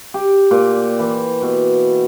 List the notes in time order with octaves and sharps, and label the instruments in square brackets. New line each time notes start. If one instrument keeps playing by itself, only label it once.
[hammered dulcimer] G4
A#2
E3
B2